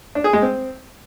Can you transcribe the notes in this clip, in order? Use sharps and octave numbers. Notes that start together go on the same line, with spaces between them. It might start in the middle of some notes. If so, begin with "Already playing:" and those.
D4
G#4
G#3
C4